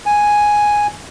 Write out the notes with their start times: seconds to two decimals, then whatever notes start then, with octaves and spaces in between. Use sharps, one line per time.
0.06 G#5